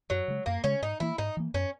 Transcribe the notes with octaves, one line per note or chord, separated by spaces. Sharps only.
F#2 F#3
C#3 G#3
F#2 A#3
C#3 G#3 C#4
G#2 D#4
E3 A#3 E4
G#2 D#4
E3 A#3
F#2 C#4